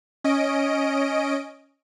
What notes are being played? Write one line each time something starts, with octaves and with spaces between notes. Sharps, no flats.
C#4 D#5 D7